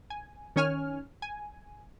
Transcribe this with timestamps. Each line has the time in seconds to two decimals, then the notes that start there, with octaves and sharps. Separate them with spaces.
0.10 G#5
0.56 D#3 C#4 C#5 G#5 F6
1.22 G#5